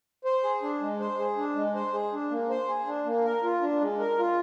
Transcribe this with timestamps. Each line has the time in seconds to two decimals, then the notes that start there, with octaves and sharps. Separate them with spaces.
0.25 C5
0.44 G#4
0.62 D4
0.81 G#3
1.00 C5
1.19 G#4
1.37 D4
1.55 G#3
1.75 C5
1.93 G#4
2.12 D4
2.31 A#3
2.50 C5
2.68 G#4
2.87 D4
3.05 A#3
3.25 A#4
3.43 F4
3.61 D4
3.81 G#3
3.99 A#4
4.18 F4